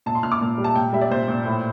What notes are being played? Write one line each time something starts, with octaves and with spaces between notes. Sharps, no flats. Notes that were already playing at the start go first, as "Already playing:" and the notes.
A#2 A5
C6
A#2 F6
D6
A#2
G3
A5
A#2 G5
G3 E5
D5
A#2 C5
A#2
A2